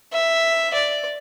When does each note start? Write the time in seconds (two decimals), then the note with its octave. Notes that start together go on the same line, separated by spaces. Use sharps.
0.12 E5
0.73 D5